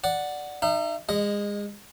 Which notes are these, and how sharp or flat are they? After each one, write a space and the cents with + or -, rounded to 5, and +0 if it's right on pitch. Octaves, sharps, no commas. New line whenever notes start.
D5 +0 F#5 +0
D#4 -25 E5 +35
G#3 -25 D#5 +0